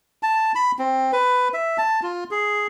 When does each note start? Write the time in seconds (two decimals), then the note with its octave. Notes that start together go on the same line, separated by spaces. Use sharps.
0.23 A5
0.55 B5
0.79 C4
1.13 B4
1.54 E5
1.78 A5
2.03 F4
2.31 G#4